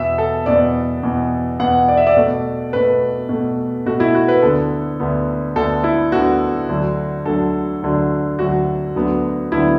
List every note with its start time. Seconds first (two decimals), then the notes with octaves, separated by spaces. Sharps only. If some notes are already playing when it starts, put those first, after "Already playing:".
Already playing: E2 B2 B3 E5
0.18 A4
0.46 E2 B2 B3 D5
1.03 E2 B2 B3
1.59 E2 B2 B3 F#5
1.88 D5
1.97 E5
2.07 D5
2.16 B2 A3
2.73 B2 A3 B4
3.29 B2 A3
3.86 B2 A3 F#4
4.00 E4
4.14 F#4
4.28 B4
4.42 D2 D3 B3 A4
5.00 D2 D3 B3
5.56 D2 D3 B3 A4
5.84 E4
6.12 D2 D3 B3 F#4
6.69 D2 D3 F#3
7.26 D2 D3 F#3 A4
7.82 D2 D3 F#3
8.39 D2 D3 F#3 F#4
8.96 D2 D3 F#3 B3
9.52 D2 D3 F#3 B3 E4